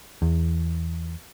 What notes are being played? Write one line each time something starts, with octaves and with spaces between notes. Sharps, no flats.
E2